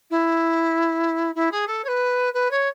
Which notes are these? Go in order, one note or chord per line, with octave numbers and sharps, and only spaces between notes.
E4
E4
G#4
A4
C#5
B4
B4
C#5